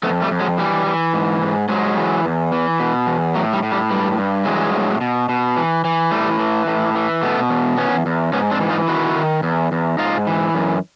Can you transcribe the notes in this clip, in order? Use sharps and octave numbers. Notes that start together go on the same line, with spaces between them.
F2 A3 B3
G3 A3
F2
F#3 G#3
E3 G3
E3
G#2
G#2
G#2 F#3 G#3
E3
E2
E3
B2
E2
A2 F#3
G3
A2
G3
G2 G3
G2
E3 F#3 G#3
A2
B2
B2
E3
E3
A2 G3 A3
E3
A2
E3
B2 A3 B3
E2
E2 B3 C#4
E2
G#2 B3 C#4
C4 D4
E3
D#4 F4
D#3 E4 F#4
D#3
E2
E2
G#2 D#4 F4
E3
F#2